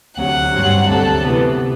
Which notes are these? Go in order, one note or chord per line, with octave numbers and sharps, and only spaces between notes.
D2 C3 F#3 F#5
G2 F#3 C4
D2 C3 F#3 A4
C3 E3 B3